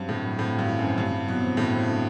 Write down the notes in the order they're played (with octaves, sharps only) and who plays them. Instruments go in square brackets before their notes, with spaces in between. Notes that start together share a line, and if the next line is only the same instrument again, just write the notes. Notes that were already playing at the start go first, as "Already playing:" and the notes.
Already playing: [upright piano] G2 [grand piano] F#3 C4
[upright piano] A2 [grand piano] D3
[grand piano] F#3
[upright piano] A2 [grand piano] C4
[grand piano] F#3
[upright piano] G2
[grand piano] E4
[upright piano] F#2 [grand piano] C4
[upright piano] G2 [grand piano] D3
[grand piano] E4
[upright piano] B2 [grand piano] F#3
[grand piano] C4
[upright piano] A2 [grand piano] F#3
[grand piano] C4
D3